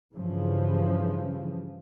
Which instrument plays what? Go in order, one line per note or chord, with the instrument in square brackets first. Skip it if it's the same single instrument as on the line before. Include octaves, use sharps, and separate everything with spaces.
[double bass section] G2 C#3 E3 F3